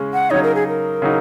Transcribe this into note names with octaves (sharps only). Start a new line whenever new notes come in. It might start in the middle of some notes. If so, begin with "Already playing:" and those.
Already playing: C#3 G#3 C#4
F#5
C#3 F#3 D#4 C#5
A#4
G#4
A#4
C#3 F#3 D#4